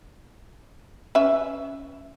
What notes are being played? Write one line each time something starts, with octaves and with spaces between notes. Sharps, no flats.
C#4 B4 E5